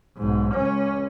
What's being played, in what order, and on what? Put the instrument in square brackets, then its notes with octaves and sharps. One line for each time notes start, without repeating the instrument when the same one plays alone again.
[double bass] B1 G#2
C#2 C#4